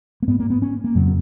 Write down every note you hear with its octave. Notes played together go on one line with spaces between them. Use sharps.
A#3
G#2 B3
A#3
B3
C#4
A#3
F2 C#3 F#3